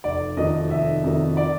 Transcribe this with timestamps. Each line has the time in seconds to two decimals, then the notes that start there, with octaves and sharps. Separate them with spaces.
0.04 F1 D5
0.37 F2 C3 D#3 D#5
0.70 F1 E5
1.04 F2 C3 D#3
1.37 D5